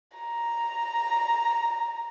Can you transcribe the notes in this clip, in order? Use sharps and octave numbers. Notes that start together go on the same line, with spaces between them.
A#5